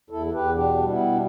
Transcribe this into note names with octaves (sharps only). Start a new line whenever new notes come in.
E2 E4 A4
A4
E2 G4 B4
B2 D4 G4
G3
B3 E4
B2
D4